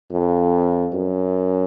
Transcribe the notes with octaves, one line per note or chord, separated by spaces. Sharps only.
F2
F#2